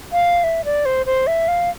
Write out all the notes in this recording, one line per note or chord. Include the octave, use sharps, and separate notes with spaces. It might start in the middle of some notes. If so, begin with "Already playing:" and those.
F5
E5
D5
C5
C5
E5
F5